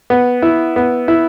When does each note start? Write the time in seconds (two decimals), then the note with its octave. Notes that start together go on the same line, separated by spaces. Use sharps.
0.10 B3
0.42 E4
0.76 B3
1.08 E4